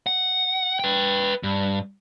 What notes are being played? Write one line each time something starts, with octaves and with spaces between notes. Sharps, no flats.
F#5
B4 G5
G2